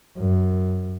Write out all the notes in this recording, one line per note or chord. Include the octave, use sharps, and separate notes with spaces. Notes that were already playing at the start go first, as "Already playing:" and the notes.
F#2